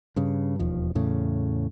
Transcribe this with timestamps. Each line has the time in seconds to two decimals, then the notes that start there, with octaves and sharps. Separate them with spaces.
0.16 G2 C#3
0.59 E1 D#2 D#3 F3
0.95 E2 A2 C#3